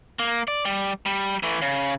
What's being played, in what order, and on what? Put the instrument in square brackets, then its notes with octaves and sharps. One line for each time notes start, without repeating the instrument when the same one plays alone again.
[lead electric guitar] A#3
D5
G3
G3
E3 A3
C#3